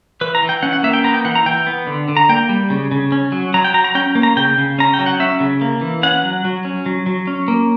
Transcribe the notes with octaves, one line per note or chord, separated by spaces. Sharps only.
E3 B4
A#5
E3
G5
C#4 F#5
F#5
A#3 E5
G5
B3 A#5
G5
E3 F#5
A#5
E3 G5
B3
D3
D3
A#5
A#3 G5
G3
C#3
C#3
C#4
F#3
F#3 A#5
G5
F#3 A#5
A#5
C#4 G5
A#3
A#5
C#3 G5
C#3
C#4 A#5
G5
F#3
F#5
C#4 E5
C#3
A#3
E3
C#4 F#5
F#3
F#3
C#4
F#3
F#3
C#4
A#3